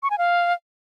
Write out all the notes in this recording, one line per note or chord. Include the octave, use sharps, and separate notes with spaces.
C#6
G#5
F5